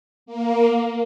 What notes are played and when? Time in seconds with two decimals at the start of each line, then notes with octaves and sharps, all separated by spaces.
0.26 A#3